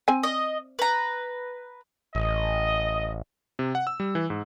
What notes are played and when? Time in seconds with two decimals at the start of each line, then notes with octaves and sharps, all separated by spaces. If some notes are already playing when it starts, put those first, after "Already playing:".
0.08 C4 G#5
0.23 D#5
0.79 B4 A#5
2.15 A1 D#5
3.59 C3
3.75 F#5
3.87 E6
4.00 G3
4.15 E3
4.30 G#2